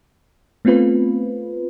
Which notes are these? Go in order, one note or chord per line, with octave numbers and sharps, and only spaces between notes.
A3 B3 C4 F4 B4